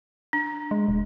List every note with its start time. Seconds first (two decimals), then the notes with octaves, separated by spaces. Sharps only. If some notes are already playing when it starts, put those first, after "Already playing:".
0.33 D4
0.71 G#3
0.88 D#1